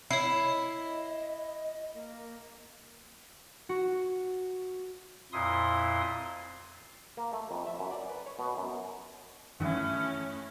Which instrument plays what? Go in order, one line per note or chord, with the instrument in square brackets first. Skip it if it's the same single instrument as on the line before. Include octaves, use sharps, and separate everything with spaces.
[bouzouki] E4 [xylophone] C#5 C7
[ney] D#5
A#3
[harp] F#4
[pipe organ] F2 A#2 E4 C6 D#6
[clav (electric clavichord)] A#3
A3
F2
E5
F#2
D5
B4
C#5
B2
F#2
[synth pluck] G2 D#3 E3 [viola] A3 C#4 [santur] E4 D#5 F#5